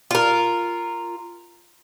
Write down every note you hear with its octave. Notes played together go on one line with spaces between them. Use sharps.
F4 A#4